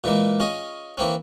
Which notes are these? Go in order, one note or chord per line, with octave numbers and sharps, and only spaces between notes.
A#2 E3 G#3 A#3
C#4 F4 G#4 D#5
E3 A#3 C4 C#4